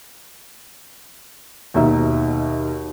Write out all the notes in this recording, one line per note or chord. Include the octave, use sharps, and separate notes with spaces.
D#2 B2 D#3 D#4 E5